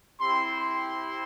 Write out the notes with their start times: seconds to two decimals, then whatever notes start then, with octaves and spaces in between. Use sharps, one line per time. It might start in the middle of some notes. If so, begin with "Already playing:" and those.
0.21 C4 E4 G4 C6
0.56 C6